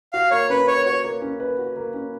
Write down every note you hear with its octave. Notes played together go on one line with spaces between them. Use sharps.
F#4 F5
A#3 C#5
C#4 B4
B4 C#5
F#4 C#5
A#3
C#4
B4
F#4
A#3
C#4